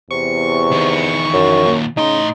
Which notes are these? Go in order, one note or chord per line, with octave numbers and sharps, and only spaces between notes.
E2 C3 C#6
D#3 E3
F#2
D#2 A#2
A2 C#3 D#4 C6